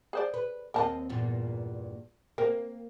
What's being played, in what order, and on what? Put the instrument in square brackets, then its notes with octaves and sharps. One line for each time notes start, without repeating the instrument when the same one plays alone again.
[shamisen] G#4 C5 D5
[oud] B4
[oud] D#2 C4 D#5 [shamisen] A#4 A5
[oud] E2 G2 A#2
[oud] A#3 [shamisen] C4 A#4